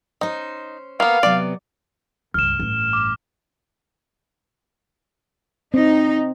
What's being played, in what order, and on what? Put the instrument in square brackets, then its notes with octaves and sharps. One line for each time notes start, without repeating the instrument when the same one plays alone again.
[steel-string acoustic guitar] C#4 C5 [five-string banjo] D#4
[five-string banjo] A#3 B3 [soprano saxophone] F5
[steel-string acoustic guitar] C3 F#3 B3 [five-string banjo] D5
[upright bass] C#2 G2 [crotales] F6 E7
[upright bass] A1 G2
[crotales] D6
[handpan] C4 [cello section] D#4